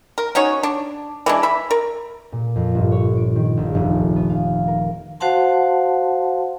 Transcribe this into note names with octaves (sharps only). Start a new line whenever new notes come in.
A#4
C#4 D#4 F#4 C#5
D4
E3 G#3 D4
E5 B5
A#4
A#2
F2
G1
C#5
D7
D#3
A#1
F1
B3
F5
A#4
F#4 C5 F5 F#5 A5 C6